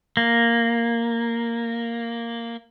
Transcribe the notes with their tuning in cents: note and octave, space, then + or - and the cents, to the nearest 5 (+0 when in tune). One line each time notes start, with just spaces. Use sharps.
A#3 -5